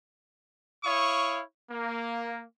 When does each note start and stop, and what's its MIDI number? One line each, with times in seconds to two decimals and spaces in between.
0.84 1.41 64
0.84 1.41 73
0.84 1.41 77
0.84 1.41 85
0.84 1.41 87
1.71 2.43 58